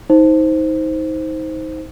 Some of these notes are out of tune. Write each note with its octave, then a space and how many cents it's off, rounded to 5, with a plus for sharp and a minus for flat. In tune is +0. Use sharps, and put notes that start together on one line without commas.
D#4 +30 C5 +0